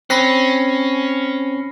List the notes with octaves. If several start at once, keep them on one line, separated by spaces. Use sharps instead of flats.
C4 C#4 B5 A#6 C7